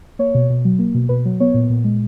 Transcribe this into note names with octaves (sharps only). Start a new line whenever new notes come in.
A#3 C#5
B2
B2
F#3
A#3
B2
B2 B4
F#3
B3 C#5
A#2
A#2
G#3